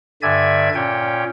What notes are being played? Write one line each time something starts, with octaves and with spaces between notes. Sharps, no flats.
G2 D3 D5 E5 G#5 G#6
A#2 C#4 C#5 G5